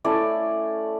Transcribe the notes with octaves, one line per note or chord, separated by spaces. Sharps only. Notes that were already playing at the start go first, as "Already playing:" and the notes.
A3 C#4 E4 D5